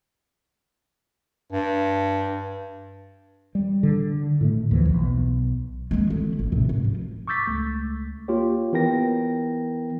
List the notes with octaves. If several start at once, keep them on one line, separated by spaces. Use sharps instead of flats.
G2
G3
D3
A2 D3 A3
D#2 E3 F3
B1
G#3 A#3
D3 E4
A1
A2 C3
G#2
F3
C#6 D6 E6 G6 A6 B6
C#2 A3
A#3 F4 G4 C#5
E3 B3 E4 A#4 G5 A#6